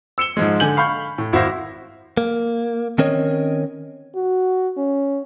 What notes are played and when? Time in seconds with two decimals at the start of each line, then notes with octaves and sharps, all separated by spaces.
0.18 E6 C#7 E7 G7
0.37 G#2 F3 G#3
0.60 D3 G#5 G6 F#7
0.77 F5 B5 C#6 G6
1.18 A2
1.33 G#1 E4 F#4 C5 F5 A#6
2.17 A#3
2.98 D#3 C4 C#4 A#4 C#5 D#5
4.16 F#4
4.77 C#4